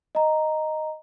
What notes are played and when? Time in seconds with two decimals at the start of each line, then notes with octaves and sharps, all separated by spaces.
0.15 D#5 A#5